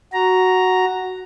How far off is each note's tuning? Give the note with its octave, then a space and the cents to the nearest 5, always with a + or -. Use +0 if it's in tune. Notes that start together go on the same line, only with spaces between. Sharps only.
F#4 +0 A#5 +0